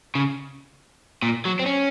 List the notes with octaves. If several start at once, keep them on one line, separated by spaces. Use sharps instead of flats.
C#3
A#2
F#3
C4
C#4